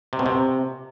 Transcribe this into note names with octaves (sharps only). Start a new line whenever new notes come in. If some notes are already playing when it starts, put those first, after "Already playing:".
C3
B2
C3